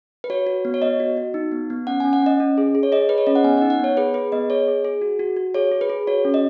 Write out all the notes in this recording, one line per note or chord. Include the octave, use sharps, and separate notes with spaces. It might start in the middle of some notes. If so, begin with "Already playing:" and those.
B4
F#4 C#5
F#4
B3
C#5
B3 D#5
F#4
F#4
D#4
B3
B3
C#4 F#5
G#5
C#4
F#5
C#4 D#5
C#4
G#4
G#4
C#5
G#4 D#5
G#4 B4
C#5
C#4 D#5
F#5
B3 G#5
F#5
D#4
F#5
B3 C#5
G#4 B4
G#4 B4
B3 D#5
G#4 C#5
G#4
G#4
F#4
F#4
F#4
G#4 C#5
G#4
B4
G#4
F#4 C#5
C#4
D#5